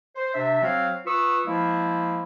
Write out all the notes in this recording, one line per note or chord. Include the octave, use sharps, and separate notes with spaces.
C5
C3 D4 E5
F#3 C4 F#4 C5 F5
F4 B4 C#6 D#6 E6
F3 G#3 A#3 E4